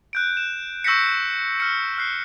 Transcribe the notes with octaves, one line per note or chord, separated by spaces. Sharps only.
F#6 G6 D7
E7
C#6 E6 G6 A#6 B6 C#7
F6 C#7
F6 F#6 C7